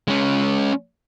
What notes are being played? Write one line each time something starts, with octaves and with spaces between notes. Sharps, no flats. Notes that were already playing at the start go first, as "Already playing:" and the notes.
G#3 C#4